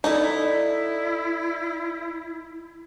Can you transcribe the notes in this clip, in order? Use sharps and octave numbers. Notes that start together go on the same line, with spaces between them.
D#4 E4 A4 D5 F#5